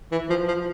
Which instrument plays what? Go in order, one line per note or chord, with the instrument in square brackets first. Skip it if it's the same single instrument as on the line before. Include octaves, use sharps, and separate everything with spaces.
[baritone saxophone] E3
F3
F3